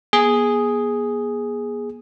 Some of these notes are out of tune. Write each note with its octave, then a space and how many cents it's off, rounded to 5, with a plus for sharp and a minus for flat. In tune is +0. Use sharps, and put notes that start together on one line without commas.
B3 -45 G#4 +0